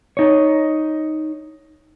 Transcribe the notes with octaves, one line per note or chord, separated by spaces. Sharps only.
D#4 C#5